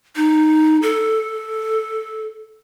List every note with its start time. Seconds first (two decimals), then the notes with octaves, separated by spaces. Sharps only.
0.16 D#4
0.83 A4